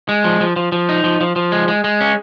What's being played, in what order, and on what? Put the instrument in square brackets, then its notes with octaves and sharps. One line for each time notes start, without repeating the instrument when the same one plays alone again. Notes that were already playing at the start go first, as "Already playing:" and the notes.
[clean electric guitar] G#3
F3
F3
F3
F3
D#4
F3
F3
F3
G#3
G#3
G#3
C#4